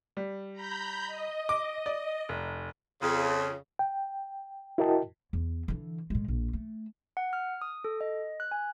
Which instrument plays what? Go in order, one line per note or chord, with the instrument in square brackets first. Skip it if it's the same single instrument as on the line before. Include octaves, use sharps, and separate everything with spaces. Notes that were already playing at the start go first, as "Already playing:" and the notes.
[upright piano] G3
[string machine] A#5 B5 G6
D#5
[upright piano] D6
D5
F1
[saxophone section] F2 C#3
[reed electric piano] G5
E4 F#4 A#4 D#5 G5 A5
[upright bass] E2
D3 E3
A2 G#3
A#1
A3
[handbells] F#5
F6
D#6
A4
D#5
F#6
G#5